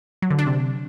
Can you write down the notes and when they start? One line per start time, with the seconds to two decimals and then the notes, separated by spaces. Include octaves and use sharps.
0.22 F#3
0.30 D3
0.39 D4
0.47 C3